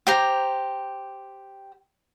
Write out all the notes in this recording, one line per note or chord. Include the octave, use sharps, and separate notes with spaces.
G4 C5 A#5